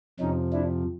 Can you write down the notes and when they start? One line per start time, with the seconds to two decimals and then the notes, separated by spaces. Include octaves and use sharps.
0.20 F2 C3 F3 C#4 D#4
0.53 D4 E4